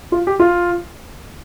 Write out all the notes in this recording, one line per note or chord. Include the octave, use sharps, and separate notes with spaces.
F4
G4
F4